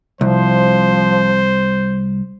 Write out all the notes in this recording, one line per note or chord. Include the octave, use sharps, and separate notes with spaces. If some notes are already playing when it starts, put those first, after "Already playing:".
C2 F3 C5